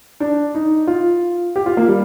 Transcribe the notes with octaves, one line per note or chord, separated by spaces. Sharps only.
D4
D#4
F4
G4
F4
A#3
G3